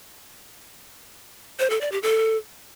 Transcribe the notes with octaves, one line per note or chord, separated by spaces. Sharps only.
C5
A4
D5
G4
A4